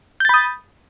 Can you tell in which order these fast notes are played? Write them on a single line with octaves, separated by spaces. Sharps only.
G6 A6 B5 D#6